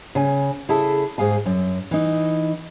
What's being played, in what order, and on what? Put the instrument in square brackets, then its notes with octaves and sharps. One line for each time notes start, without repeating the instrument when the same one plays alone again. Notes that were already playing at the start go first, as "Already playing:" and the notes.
[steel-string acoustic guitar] C#3 G#5
C#3 E4 G#4 A4 E5 A5
G#2 G#4 F5 G#5
F#2
E3 D#4